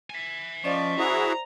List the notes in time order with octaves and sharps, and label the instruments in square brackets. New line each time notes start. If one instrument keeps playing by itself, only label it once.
[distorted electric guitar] E5 G#5
[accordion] F3 [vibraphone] C#4 D#5 C#6 [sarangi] D5
[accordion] E4 F#4 G#4 [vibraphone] C5 [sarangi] A#5